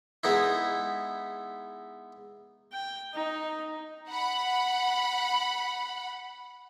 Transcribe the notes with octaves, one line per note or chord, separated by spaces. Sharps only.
G#3 B3 D#4 E4
G5
D#4
F#5 B5